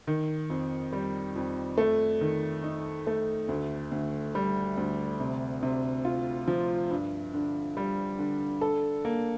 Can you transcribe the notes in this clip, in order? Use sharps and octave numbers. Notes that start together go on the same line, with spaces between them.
D#3
F2
G3
F2
A3
D#3
D#4
A3
D2
D2
G3
D2
C3
C3
F4
F3
G2
D3
G3
D3
A4
A#3